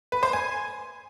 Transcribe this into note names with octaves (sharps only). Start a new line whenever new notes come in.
B4
C5
G#5